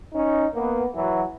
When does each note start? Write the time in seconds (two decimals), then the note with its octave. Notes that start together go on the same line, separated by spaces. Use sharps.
0.14 C#4 D#4
0.54 A#3 B3
0.95 E3 F#3